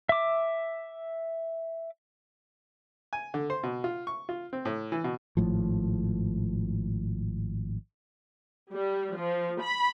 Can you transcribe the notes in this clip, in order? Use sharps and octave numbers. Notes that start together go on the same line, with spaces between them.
E5 D6
G#5
D3
C5
B2
F4
C#6
F4
C4
A2
E3
B2
G#1 A2 F3
G3
F3
B5